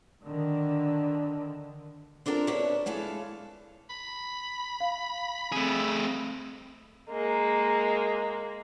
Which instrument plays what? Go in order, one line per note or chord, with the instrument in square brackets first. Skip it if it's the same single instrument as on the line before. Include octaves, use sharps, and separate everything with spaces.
[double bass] D3 D#3
[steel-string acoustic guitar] C4 D4 F4 A4 A#4
B2 D4 B4 C#5 E5
E3 G#3 A4 F5
[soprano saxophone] B5
[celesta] F5
[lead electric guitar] A3 G#4 [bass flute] C4
[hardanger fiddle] G#3 A#3